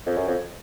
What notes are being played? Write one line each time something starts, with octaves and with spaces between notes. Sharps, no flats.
F2
F#2
F2